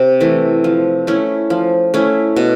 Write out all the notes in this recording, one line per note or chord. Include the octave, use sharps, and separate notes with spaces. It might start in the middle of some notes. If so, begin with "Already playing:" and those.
Already playing: C3
E3 A3
F3
A3 C#4 E4
F3
A3 C#4 E4
B2